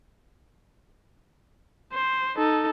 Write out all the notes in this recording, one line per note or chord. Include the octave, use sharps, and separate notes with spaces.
C5
D#4 A4